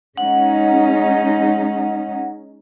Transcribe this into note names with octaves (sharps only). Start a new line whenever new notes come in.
G#3 C#4 D#4 F#5